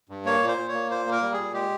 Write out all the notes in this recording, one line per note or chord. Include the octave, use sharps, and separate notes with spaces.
G2
A#3 C#5
A#2
C5
A#2
C#5
A#3
A#2 C5
A#3
A#4
G3
G#4
A#2
G#3 G4